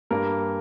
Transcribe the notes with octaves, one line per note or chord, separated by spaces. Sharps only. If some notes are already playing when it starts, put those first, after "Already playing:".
G2 G3 A#3 A#4